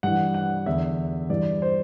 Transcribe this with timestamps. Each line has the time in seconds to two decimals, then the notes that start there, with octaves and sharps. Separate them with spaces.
0.03 G2 E3 F#5
0.34 F#5
0.66 E2 D3 E5
1.30 G2 E3 D5
1.62 C5